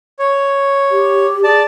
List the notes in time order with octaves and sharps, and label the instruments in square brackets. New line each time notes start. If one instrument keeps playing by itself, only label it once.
[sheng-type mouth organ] C#5
[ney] G4
[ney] G#4 [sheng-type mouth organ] D5 A5